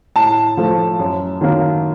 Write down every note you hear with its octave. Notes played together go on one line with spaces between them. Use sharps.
A2 A5
F3 A3
F#2
D#3 F#3 A#3